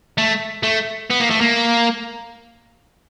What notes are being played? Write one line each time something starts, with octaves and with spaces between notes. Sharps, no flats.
A3
A3
B3
A#3
A3
A#3